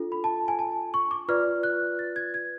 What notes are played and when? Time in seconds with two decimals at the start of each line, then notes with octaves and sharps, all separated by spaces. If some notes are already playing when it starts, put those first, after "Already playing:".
Already playing: D4 F4 A4
0.12 B5
0.24 A5
0.48 G#5
0.59 A5
0.94 C#6
1.11 D6
1.29 F4 B4 D5 F6
1.63 F#6
1.99 A6
2.16 G#6
2.34 G#6